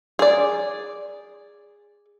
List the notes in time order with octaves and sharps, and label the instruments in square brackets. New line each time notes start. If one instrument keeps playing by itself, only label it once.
[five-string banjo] G#4 D5